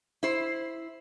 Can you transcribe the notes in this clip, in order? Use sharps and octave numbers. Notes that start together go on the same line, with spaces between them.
E4 C5